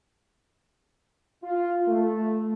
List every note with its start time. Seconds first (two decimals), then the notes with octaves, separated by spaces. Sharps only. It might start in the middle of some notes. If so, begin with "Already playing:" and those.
1.44 F4
1.88 A3